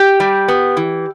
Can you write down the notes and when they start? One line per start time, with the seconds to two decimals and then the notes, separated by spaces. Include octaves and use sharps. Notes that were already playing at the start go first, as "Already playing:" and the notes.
Already playing: G4
0.20 G3
0.48 B3
0.77 E3